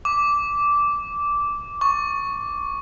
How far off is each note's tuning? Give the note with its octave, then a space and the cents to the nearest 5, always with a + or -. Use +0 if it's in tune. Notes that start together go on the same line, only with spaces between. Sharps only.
D6 -10
C#6 +0